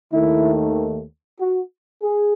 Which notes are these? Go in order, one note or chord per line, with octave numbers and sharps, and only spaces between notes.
D#2 D#3 A3 E4
F#4
G#4